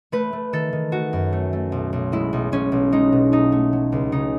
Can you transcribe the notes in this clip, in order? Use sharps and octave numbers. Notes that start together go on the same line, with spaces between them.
A3 B4
A3
D#3 A4
D#3
A3 F#4
F#2
A3
A3
B1
B1
G#3 E4
B1
B1 C#4
B1
G#3 D#4
B2
A3 D#4
A3
F#3
C#2
C#3 D#4